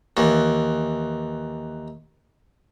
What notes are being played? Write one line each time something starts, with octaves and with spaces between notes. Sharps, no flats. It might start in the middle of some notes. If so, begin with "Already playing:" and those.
D#2 E3